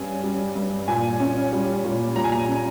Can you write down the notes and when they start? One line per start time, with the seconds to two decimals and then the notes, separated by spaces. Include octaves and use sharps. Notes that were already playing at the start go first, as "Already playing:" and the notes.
Already playing: G2 C#4 G#5
0.24 G3
0.55 G2
0.88 A#2 G#5
1.20 C#4
1.53 G3
1.84 A#2
2.16 A#2 A#5
2.24 G#5
2.32 A#5
2.48 C#4